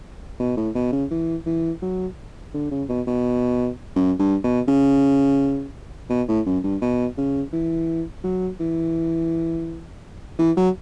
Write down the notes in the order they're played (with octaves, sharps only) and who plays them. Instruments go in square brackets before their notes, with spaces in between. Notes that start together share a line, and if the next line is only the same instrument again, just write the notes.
[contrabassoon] B2
A2
B2
C#3
E3
E3
F#3
D3
C#3
B2
B2
F#2
G2
B2
C#3
B2
A2
F#2
G2
B2
C#3
E3
F#3
E3
E3
F#3